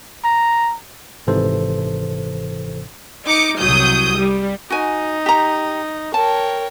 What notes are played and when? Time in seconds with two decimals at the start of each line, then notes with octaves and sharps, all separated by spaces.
0.24 A#5
1.27 G#1 G#2 C3 E3 A4 C5
3.26 D#4 D6 C#7
3.58 C2 F#3 D#6 G6
4.18 G3
4.70 D#4 F#4 G#5
5.26 G4 A#5
6.14 A#4 C#5 G5 A5